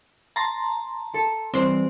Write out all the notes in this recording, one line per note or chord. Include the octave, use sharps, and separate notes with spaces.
A5 A#5 C6
A4
E3 G3 C4 C5